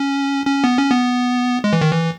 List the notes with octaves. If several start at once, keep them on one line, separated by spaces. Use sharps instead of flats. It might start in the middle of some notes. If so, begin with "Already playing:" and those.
Already playing: C#4
C#4
B3
C#4
B3
G#3
E3
D#3
E3